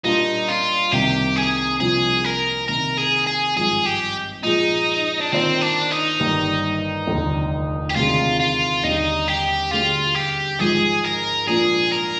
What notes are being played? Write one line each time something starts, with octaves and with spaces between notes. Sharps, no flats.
A#2 G3 A#3 D4 D#4 F4
F4
C2 C3 D#3 A#3 G4
G#4
C2 C3 F3 A#3 D4 G#4
A#4
C3 D#3 A#3 A#4
G#4
G#4
G#1 G2 F3 G#4
G4
A#2 F3 G#3 D#4
D4
D#3 A#3 C4 F4 C5
D4
D#4
G1 G2 D#3 G3 A#3
F1 D#2 D3
G4
D2 C3 D#3 G#3 D4 F4
F4
D#2 D3 G3 D4 D#4 G4
G4
D2 D3 G3 D4 F4 G#4
G4
G#1 G#2 F3 G#3 G#4
A#4
A#2 F3 A#3 D4 G#4
A#4